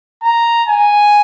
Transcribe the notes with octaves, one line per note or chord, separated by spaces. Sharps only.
A#5
G#5